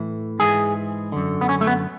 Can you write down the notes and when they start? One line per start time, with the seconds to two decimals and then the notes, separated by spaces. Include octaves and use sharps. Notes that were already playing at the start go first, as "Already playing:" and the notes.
Already playing: A2 E3
0.39 G#2 E3 G#4
1.12 F#2 D3
1.41 B3
1.49 C#4
1.61 A3
1.67 B3